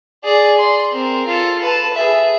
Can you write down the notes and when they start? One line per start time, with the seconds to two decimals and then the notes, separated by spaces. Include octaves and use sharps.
0.24 G#4 D5
0.58 C6
0.93 C4 A#4
1.27 F4 A4
1.61 B4 A5
1.94 G#4 E5